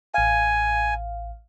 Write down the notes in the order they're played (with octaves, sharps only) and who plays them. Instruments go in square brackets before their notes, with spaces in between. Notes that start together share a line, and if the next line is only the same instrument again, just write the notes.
[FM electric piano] A1 F5 [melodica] G#5